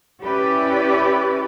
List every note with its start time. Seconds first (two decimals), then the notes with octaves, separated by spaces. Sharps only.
0.23 C#4 E4 G4 B4 D5